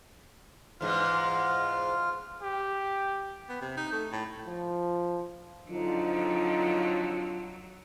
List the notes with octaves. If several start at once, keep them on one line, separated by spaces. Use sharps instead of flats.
E2 G#2 G#3 F4 F6
G4
B3
C3
D#4
A3
A2
F3
F2 D3 F#3 D#4 F4